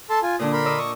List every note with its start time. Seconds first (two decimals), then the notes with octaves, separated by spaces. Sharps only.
0.10 A4 A5 C6
0.23 F4 G#5
0.39 A#2 D3 D4 D#6
0.53 A#4 B5 C6
0.65 D5 D#5 E6
0.78 C#6 D#6